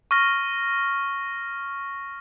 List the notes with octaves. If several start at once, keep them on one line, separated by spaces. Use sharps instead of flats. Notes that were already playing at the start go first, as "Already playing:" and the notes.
C#6 F6 A#6